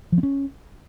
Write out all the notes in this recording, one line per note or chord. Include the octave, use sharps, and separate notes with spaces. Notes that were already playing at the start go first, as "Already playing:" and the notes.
F3
C4
C#4